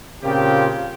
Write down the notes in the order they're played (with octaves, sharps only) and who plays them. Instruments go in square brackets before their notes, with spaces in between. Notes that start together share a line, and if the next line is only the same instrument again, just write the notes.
[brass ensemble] A#2 C#3 A#3 C4 F4 G4